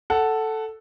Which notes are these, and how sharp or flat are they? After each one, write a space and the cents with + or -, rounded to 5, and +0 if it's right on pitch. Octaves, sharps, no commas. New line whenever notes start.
A4 +0 F#5 +10